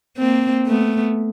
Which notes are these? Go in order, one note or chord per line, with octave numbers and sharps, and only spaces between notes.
A#3 C4
A3 B3